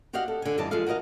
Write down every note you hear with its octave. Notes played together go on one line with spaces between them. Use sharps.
F#4 G4 D5 D#5 F5 F#5
A4
D3 G#5
G2 E3 G3 D5 D#5 A5
F3 G#3 G#4 A4 F5
F#4 A#4 B4 D#5 F5